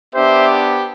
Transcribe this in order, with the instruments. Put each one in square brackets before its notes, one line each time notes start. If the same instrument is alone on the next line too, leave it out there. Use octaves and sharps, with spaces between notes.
[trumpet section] B3 D4 G4 C5 E5